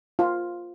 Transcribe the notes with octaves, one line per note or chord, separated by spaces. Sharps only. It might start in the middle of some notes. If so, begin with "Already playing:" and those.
F4